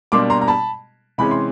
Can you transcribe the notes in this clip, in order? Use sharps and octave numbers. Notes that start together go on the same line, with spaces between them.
B2 G3 A#3 D4 C6 D6
A#5 C6
A#5
A5 B5
C3 E3 G#3 C#4 B5
C6